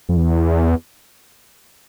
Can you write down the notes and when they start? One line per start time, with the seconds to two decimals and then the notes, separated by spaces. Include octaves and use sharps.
0.09 F2
0.17 E2